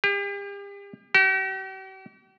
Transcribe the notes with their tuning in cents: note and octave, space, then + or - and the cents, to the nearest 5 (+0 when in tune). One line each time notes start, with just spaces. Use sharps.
G4 +40
G4 -45